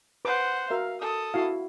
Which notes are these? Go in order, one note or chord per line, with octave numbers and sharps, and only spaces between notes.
B4 C5 F#5 D6
F#4 A#4 E5 F5
A4 D#6
E4 F#4 F5